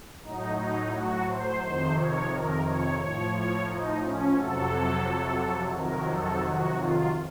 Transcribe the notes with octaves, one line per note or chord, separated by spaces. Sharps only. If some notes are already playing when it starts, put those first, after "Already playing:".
A2 F#3 D#4
D#4
F#4
C5
F2 C3 D#3 C5
C#5
A#4
C#5
A2 F3 C#5
C#5
D#4
C#4
F2 C3 F#3 A4
F2 C3 D#3 F#3 A#4
A4
F#4
F4